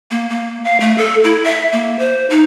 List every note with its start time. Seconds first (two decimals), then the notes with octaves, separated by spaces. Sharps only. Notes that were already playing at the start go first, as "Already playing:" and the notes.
0.11 A#3
0.29 A#3
0.64 F5
0.80 A3
0.98 A4
1.24 E4
1.44 E5
1.72 A#3
1.99 C5
2.30 D#4